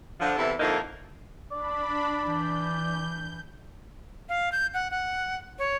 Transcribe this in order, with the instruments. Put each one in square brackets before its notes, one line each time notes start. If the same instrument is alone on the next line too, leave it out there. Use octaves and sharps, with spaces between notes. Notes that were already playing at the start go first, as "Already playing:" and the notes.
[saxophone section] D3 F3
E2 C3 E3 E4 A4
F2 D3 F3 A#3 D#4 E4
[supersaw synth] D4 B5 [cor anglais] D5
[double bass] E3 [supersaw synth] G6
[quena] F5
G6
F#5
F#5
C#5